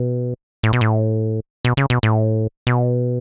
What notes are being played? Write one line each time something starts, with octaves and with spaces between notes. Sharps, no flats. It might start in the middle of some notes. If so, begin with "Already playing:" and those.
Already playing: B2
A2
B2
A2
B2
C#3
B2
A2
B2